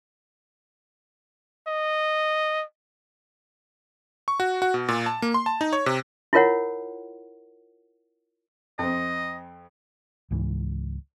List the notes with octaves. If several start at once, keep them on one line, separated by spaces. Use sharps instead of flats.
D#5
C#6
F#4
F#4
B2
A#2
A5
A#3
C6
A5
D#4
C#5
C3
E4 F4 A#4 C#5 F#5
F2 C4 D#5
C#2 G#2 E3